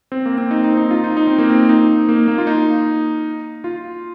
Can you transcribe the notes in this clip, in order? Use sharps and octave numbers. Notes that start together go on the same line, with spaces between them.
C4
A#3
C4
D#4
D#4
C4
D#4
F4
D#4
D#4
C4
A#3
C4
D#4
A#3
A#3
F4
D#4
F4